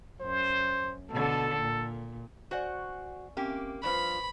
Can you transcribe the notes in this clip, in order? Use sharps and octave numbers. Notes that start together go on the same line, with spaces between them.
F#2 C5
B2 D3 A4
A#2
F#4 C5 D5 F#5 G#5 C#6
A#3 C4 C#4 G4 E5
G2 F3 F4 B4 C5 B5 C#6